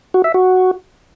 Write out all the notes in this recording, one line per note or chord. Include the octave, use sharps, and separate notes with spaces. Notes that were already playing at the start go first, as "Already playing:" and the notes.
F#4
E5
F#4